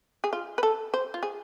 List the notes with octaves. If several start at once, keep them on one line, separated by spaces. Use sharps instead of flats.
G#4
F4
B4
A4
C5
F4
G#4